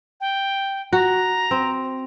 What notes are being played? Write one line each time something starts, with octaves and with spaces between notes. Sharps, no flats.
G5
F#4 A#5
C4